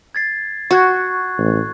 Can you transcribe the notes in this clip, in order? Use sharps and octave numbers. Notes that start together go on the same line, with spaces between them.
G#6 A6 C7
F#4 C#6 F#6 G#6
A1